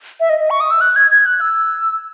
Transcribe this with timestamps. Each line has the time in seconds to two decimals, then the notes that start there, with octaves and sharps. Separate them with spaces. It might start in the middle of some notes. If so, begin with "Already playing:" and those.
0.20 E5
0.30 D#5
0.40 D#5
0.50 C#6
0.60 D#6
0.70 E6
0.81 F#6
0.96 G#6
1.11 G#6
1.26 F#6
1.41 E6